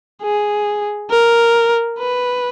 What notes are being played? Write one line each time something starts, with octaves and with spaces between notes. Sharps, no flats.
G#4
A#4
B4